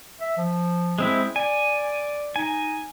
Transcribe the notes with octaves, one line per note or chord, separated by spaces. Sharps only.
E5
F3
G#3 C4 E4
D5 G#5
D#4 G#5